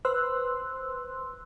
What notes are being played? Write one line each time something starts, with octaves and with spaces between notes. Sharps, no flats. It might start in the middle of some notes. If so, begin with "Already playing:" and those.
B4 C5 C6 E6 F#6